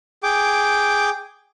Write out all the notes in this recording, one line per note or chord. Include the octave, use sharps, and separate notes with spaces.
G#4 G5 D6